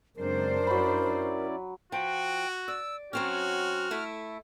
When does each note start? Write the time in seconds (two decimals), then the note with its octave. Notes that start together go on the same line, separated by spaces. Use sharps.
0.16 F#2 C#3 G#3 C4 D4 A#4 C5
0.67 F#3 C#4 E4 D5 B5
1.92 F3 F#4 G5
2.68 D5 E6
3.13 F#3 C4 C#4 F#4 F6
3.91 A3 E4